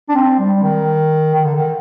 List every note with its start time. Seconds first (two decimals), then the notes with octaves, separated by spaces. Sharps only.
0.09 D4
0.15 C4
0.39 G3
0.63 D#3
1.34 D#3
1.44 D3
1.55 D#3